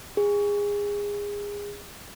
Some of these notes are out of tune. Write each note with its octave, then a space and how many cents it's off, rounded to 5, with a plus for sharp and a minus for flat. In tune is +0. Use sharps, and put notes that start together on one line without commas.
G#4 -25